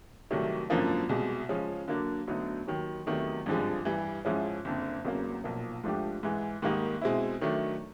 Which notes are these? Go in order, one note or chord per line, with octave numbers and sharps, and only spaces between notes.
C2 C3 D#3 F#3 A3
G#1 F#2 D3 F3 A#3
C2 B2 G#3
C#3 F3 G#3 C#4
D3 F#3 A#3 D4
D2 D3 F#3 B3 D#4
D#2 D#3 F#3
E2 C3 D#3 F#3 A3
G#1 G2 D3 F3 G#3
G2 E3 G3
G#2 F3 G#3 C#4 E4
F#1 F2 D3
F1 E2 C#3 F#3 A#3
B1 A#2 F3 A#3
G#2 F3 A3 D4 G4
G#2 E3 G#3
G#2 D#3 G3 A#3 D#4
B2 G#3 C4 E4
D#3 F#3 A3 D4